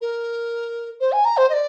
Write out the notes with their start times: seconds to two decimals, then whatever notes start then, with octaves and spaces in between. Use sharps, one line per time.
0.01 A#4
1.00 C5
1.12 G#5
1.25 A#5
1.37 C5
1.50 D#5
1.53 D5